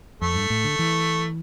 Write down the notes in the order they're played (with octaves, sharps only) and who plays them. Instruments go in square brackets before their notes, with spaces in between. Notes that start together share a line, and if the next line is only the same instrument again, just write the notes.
[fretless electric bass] F2 [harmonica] A3
[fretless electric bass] G2
A2
D3
E3